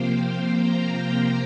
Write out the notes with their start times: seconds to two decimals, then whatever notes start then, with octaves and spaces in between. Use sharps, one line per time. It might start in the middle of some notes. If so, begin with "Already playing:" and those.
Already playing: C3 F3 A#3 C5 F5 G5
0.60 A#5
0.97 G5